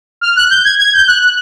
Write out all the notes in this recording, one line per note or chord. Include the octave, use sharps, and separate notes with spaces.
F6
F#6
G6
G#6
G#6
G6
F#6